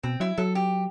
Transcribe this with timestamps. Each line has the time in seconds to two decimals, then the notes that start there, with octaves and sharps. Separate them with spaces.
0.03 B2 C4
0.20 F#3 E4
0.38 F#3 A4
0.55 G4